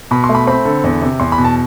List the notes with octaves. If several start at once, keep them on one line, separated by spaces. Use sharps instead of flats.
B2 B5
C6
A3
B5
C4 B5
D3
E2
C3
E2 C6
B5
B2
A5